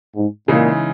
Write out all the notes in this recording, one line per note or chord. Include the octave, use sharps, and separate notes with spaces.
G#2
A#2 C#3 E3 G#3 D#4